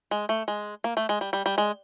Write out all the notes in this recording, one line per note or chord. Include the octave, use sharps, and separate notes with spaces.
G#3
A3
G#3
A#3
A3
G#3
G3
G3
G3
G#3